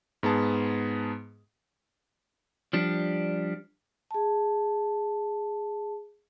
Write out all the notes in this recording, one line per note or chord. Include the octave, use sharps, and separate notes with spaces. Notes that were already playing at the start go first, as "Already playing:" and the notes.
G#2 B3 G#4 A5
F3 G3 D4
G#4 A5